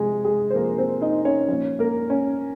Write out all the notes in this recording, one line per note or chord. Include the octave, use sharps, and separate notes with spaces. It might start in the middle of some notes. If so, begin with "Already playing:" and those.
Already playing: C3 F3 G#3 G#4
G#3 G#4
C5
C3 F3 A#3 A#4
C4 C5
D#4 D#5
C#4 C#5
A#2 F3 C#4 C#5
A#3 A#4
C#4 C#5